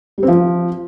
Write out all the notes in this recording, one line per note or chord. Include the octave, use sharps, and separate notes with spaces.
G3
C4
F3